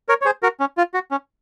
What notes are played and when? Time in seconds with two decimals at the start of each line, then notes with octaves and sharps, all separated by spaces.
0.09 A#4 C#5
0.22 C#5
0.26 G#4 C5
0.43 F#4 A#4
0.60 C#4
0.78 F4
0.94 F#4
1.11 C#4